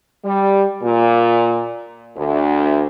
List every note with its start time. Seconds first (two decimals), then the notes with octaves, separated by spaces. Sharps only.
0.24 G3
0.83 A#2
2.17 D2